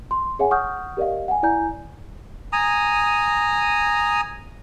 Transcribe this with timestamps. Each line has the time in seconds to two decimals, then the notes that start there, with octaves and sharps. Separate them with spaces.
0.11 C6
0.39 G#4 C#5 E5 F#5 G#5
0.51 F#5 C#6 D#6 F6 G6
0.97 G4 A#4 D5 D#5 F5
1.28 F#5 G#5
1.43 E4 D5 G#5 A#5 G6
2.53 G#5 A#5 D#6